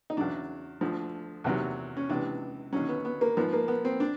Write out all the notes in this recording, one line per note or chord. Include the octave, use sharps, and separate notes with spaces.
D#4
E2 C#3 F#3 D4
D2 D3 F3
E2 C3 D#3 F#3
C#4
C#2 C3 E3 D4
D#2 D3 F#3 C#4
B3
B3
A#3
G#2 F3 B3
A#3
B3
C4
D4